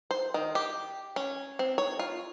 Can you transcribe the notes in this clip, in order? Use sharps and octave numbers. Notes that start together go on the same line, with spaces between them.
C5
D#3
G4
C#4
C4
C#5
F4